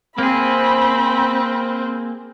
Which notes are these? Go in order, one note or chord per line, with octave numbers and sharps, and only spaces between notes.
A#3 C4 G#4 B5